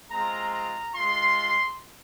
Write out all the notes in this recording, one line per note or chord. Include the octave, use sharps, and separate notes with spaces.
G#3 C4 F4 A#5
A#5
G#3 F4 C6